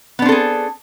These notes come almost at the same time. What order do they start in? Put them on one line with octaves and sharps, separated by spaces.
B3 D4 C4 A4 G#4